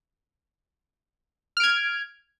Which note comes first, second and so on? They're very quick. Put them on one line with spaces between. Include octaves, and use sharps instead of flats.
F6 D7 G#6